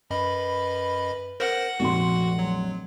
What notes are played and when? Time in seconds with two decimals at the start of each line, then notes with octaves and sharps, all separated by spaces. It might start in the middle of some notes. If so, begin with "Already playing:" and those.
0.11 F#2 B4 D#5 B5
1.40 A#4 C5 F#5 A#6
1.80 F1 A#1 F#4 C6
2.39 F#3